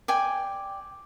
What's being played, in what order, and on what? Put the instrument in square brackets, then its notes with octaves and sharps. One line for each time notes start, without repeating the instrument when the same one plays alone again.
[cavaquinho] D5 G5 G#5